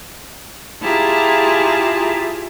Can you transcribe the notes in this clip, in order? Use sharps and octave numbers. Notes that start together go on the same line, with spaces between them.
E4 F4 G4 G#4 A5 A#5